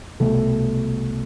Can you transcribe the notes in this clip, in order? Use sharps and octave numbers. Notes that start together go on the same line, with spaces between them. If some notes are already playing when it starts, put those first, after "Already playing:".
C2 B2 A3 A4